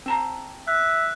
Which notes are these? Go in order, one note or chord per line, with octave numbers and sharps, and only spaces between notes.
C4 A5 A#5
E5 F#6